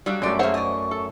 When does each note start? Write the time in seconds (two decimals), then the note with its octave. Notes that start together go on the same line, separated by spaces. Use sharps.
0.06 F#3 G3 D4 F5
0.22 F#2 G#3 A3 F#4 D5
0.39 A#3 G#4 C5 C#5 E5 F#5
0.54 D5 D#5 C#6
0.91 A4